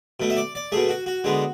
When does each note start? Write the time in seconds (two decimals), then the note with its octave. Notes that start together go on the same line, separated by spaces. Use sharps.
0.20 B2 A3
0.30 E5
0.37 D5
0.55 D5
0.72 B2 A3 G#4
0.89 F#4
1.06 F#4
1.24 D3 G#3 B3